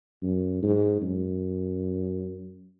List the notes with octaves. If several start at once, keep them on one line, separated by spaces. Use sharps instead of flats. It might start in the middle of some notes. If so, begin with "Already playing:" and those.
F#2
G#2
F#2